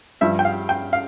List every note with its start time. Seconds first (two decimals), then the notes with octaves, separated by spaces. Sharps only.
0.21 G2 F3 E5
0.39 G5
0.45 F5
0.69 G5
0.93 F5